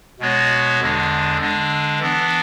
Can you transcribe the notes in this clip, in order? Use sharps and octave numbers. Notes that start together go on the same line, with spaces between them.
B2 G#3 B3 F#4 C#5
E2 D3 G#3 D4
D3 G#3 D4
E3 B3 D4